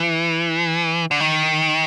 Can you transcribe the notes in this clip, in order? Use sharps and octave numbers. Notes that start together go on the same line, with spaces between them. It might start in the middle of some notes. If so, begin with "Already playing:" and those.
Already playing: E3
D3
D#3